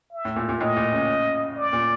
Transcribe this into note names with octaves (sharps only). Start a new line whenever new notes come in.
E5
A2
A#2
A#2
A2 D#5
A#2
C#3
D5
A#2